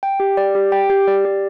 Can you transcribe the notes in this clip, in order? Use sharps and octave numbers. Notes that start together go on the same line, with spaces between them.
G5
G4
D5
G4
G5
G4
D5
G4